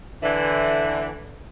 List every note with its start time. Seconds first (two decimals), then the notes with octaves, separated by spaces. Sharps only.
0.23 D3 E3